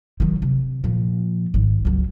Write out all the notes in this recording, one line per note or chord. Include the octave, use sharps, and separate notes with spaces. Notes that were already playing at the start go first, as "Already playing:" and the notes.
D#3 F#3
C3
A#2 F3
G#1
C#2 F#3